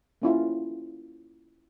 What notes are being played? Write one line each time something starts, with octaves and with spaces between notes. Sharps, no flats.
A#3 C#4 E4 F4